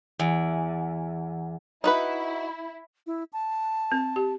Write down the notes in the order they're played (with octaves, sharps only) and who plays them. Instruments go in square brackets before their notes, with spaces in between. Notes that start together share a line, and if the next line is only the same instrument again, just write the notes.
[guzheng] E2
[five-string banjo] D#4 F#4 B4 [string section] E4
[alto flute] E4
A5
[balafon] C4
G4